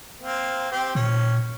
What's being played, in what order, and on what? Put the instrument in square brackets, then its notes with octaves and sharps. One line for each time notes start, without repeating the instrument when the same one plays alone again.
[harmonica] A#3 C4
C4 G4
[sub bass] A#2 [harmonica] C#4